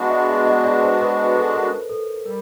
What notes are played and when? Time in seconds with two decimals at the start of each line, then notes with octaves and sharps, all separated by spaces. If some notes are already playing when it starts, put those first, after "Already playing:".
Already playing: G#3 B3 D4 F#4 F5 F#5
0.10 E5
0.28 E5
0.45 D#5
0.64 D5
0.82 C5
1.00 B4
1.36 A4
1.54 A#4
1.90 A4
2.26 G3 A#4